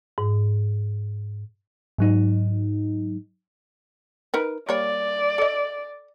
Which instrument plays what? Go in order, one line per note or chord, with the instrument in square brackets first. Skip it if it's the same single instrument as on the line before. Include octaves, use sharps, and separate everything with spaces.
[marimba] G#2
[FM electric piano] G#2 F#3 D#4
[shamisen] D#4 A#4 B4
[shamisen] G3 A#3 C#5 [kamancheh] D5
[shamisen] A4 D#5